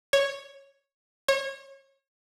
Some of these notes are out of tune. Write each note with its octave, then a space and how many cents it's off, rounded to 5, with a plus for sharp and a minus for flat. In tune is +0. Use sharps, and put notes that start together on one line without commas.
C#5 -5
C#5 -30